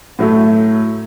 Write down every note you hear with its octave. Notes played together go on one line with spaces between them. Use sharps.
A2 F#3 A3